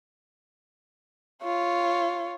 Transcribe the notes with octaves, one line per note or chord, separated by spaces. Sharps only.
F4 C#5